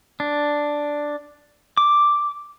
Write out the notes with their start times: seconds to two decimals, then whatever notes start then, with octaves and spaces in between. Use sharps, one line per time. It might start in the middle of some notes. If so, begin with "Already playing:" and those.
0.20 D4
1.77 D6